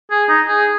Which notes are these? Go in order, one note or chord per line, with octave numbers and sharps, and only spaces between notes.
G#4
D#4
G#4